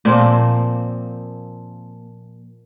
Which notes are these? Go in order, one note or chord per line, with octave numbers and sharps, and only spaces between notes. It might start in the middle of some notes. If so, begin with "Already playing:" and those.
A#2 F3 A#3 C4